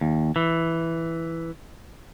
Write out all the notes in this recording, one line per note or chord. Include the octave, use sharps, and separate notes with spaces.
D#2
E3